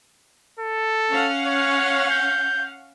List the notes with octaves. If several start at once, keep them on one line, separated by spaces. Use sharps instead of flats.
A4
C#4 F5 F#5
C#5
G6